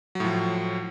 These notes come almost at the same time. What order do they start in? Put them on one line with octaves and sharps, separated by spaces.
F#3 A2 F3